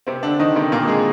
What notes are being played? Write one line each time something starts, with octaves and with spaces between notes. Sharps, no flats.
C3 C4
D3 D4
D#3 D#4
C3 C4
A#2 A#3
G#3 G#4